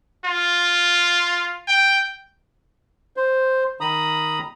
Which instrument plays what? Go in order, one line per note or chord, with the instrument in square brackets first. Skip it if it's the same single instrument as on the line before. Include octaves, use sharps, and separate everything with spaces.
[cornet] F4
G5
[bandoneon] C5
D#3 A#5 B5 D#6